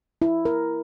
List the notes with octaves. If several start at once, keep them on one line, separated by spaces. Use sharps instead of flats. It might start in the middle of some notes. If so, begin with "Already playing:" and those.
E4
A#4